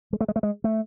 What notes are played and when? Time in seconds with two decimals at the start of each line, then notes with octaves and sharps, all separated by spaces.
0.13 G#3
0.20 A3
0.28 G#3
0.36 A3
0.43 G#3
0.64 A3